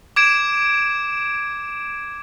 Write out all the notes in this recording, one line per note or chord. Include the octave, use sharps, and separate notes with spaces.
D6 G#6 D7 E7